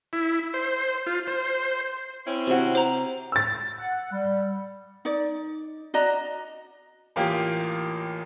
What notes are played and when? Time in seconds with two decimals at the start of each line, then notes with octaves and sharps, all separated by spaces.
0.13 E4
0.54 C5
1.07 F4
1.27 C5
2.25 C4 C#4 E4
2.47 C3 F#4
2.75 C5 A#5
3.32 E6 A6
3.78 F#5
4.12 G3
5.05 D#4 D5
5.94 F#4 D5 D#5 A#5
7.16 A1 A#3 F4 G4 G5